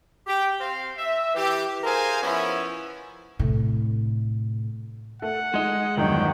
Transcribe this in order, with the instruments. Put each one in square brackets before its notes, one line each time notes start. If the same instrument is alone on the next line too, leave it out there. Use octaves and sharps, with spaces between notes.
[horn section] G4 G5
C4 F5
E5
E3 G4
G#4 A#4 C5 F5 G#5
F3 B3 C#4 E4
[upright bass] A2 C3
[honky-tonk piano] A3 A4 [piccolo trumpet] F#5
[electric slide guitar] G#3 D#5 [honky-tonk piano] D#4 G#4
[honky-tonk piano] G1 E2 G2 [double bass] D#3 F#3 [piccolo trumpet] G5